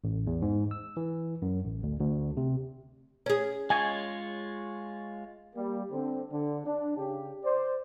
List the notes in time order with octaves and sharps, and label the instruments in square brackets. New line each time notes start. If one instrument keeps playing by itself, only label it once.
[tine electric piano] A1
E2
G#2
E6
E3
F#2
A1
D2
D2
C3
[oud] C#4 G#4
[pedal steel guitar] G#3 F4 C#5 [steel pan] G#5
[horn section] G3 A#3
D3 C4
D3
D4
C#3 G4
C5 D5